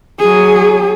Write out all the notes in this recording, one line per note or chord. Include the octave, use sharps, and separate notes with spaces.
F#3 G#4